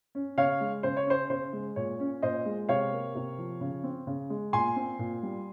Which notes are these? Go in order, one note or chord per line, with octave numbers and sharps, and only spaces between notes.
C#4
C#3 C#5 F5
G#3
C#3 C5
C#5
C#4 C5
C#3 C5
G#3
A#2 C#5
C#4
A#2 C5 D#5
G#3
C3 C#5 F5
A#3
C3
F3
C#3
C4
C#3
G#3
A#2 G#5 C6
C4
A#2
G3